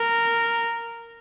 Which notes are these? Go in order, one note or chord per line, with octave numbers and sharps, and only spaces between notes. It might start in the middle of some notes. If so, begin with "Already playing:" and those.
Already playing: A#4